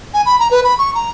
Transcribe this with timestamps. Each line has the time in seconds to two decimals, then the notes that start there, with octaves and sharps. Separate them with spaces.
0.14 G#5
0.26 B5
0.39 A#5
0.51 B4
0.64 B5
0.78 C#6
0.95 A#5